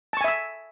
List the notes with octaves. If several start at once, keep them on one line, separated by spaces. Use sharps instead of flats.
E5 G#5 A5 C#6 E6